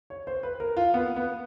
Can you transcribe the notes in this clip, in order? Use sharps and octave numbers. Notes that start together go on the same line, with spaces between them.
C#5
C5
B4
A#4
F4
B3
B3